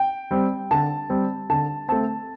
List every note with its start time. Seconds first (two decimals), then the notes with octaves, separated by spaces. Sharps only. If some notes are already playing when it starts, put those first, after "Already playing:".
Already playing: G5
0.31 G3 C4
0.71 D3 A5
1.10 G3 C4
1.50 D3 A5
1.88 A3 C4 A5